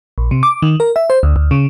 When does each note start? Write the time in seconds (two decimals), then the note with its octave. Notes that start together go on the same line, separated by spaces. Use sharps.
0.18 A#1
0.31 C3
0.43 D6
0.62 D#3
0.80 A#4
0.96 E5
1.10 C5
1.23 D2
1.36 D2
1.51 C#3